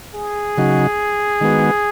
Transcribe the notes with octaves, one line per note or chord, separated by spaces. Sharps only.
G#4
C#3 F#3 D#4 F#4
D#3 G#3 B3 F#4